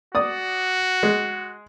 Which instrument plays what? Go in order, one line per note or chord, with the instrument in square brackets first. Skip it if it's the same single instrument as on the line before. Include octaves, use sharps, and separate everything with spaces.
[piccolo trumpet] F#4 [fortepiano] D5 D#6
[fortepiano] G#3